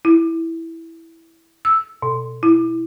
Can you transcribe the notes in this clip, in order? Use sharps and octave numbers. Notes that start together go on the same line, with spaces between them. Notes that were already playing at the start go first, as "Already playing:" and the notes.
E4
E6
B2
E4